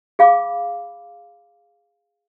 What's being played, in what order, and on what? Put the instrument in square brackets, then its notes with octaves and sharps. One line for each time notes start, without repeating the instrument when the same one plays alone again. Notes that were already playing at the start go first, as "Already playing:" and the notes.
[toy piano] G#4 F5 B5 D6